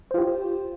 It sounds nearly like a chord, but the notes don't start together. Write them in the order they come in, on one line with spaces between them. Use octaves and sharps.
C5 F4 G4